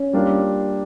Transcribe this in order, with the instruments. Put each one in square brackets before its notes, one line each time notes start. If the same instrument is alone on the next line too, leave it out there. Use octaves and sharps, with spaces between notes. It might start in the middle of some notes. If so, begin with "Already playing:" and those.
Already playing: [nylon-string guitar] C#4
[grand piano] G3 A#3 D4 F4